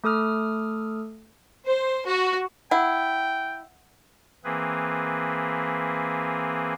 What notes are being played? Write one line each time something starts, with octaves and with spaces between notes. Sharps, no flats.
A3 A4 D#6 F6
C5
F#4
E4 F#5 G5
E3 A#3 C4 G#4 B4